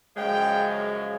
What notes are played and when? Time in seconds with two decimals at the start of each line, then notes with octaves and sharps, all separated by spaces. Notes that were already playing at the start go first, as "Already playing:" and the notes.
0.16 F#2 C#3 F3 G#3 G5